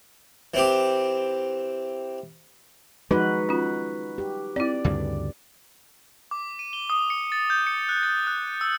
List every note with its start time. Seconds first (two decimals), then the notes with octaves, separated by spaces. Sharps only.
0.54 E3 C4 G4
3.11 F3 G#3 D#4 F#4 B4
3.49 C#4 F4
4.18 G4
4.56 C4 E4 D5
4.84 D2 G2 C#3
6.31 D6
6.59 D#7
6.73 G7
6.90 D#6
7.10 C#7
7.32 A6
7.50 G6
7.67 C#7
7.89 F#6
8.03 A6
8.27 F#6
8.61 E6